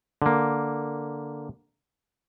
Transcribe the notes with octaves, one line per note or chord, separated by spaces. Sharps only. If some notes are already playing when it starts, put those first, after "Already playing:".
D3 A#3